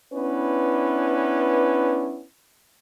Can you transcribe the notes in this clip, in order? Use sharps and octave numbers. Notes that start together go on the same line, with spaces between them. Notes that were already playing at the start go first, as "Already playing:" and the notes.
B3 C#4 D4 E4 B4